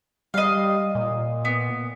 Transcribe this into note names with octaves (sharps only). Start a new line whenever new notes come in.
G3 D#5 F5
A#2
B3